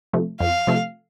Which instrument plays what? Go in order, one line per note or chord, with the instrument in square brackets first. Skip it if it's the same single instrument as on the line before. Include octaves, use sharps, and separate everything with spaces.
[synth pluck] C3 F3 A3
[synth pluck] F2 [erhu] F5
[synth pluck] C3 F3 A3